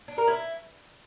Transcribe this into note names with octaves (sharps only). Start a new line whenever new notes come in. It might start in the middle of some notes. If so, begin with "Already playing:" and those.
D4
A#4
E4